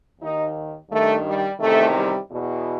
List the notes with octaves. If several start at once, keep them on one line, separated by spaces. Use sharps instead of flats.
D#2 D#3 D#4
G2 D#3 A3
G3
E2 C3 D#3 A3
G3
E2 B2